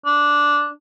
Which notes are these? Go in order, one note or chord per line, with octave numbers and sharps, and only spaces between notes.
D4